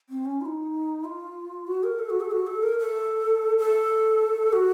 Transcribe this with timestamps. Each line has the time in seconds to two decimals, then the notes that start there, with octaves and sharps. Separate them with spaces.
0.10 C4
0.25 C#4
0.41 F4
0.45 D#4
1.04 F4
1.67 F#4
1.83 A#4
1.99 A4
2.10 F#4
2.21 A4
2.31 F#4
2.47 A4
2.63 A#4
2.79 A4
3.58 A4
4.53 F#4